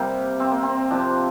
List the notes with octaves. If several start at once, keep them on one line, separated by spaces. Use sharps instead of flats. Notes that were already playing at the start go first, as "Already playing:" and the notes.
Already playing: C3 G3 A#3
C4
A#3
C4
C3 F3 D4